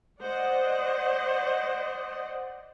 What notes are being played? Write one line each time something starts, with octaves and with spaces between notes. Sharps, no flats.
C5 D5 D#5 F#5